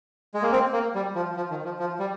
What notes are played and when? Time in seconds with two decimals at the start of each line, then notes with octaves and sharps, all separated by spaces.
0.34 G#3
0.43 A#3
0.52 C4
0.73 A#3
0.95 G3
1.15 F3
1.36 F3
1.50 D#3
1.65 F3
1.79 F3
1.99 G3